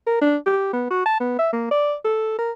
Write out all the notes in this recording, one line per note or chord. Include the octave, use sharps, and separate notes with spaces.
A#4
D4
G4
B3
F#4
A5
B3
E5
A#3
D5
A4
A#4